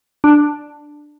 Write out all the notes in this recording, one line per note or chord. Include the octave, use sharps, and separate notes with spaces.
D4